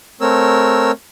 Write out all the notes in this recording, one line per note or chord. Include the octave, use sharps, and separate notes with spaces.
A3 C4 A#4 C#5 E6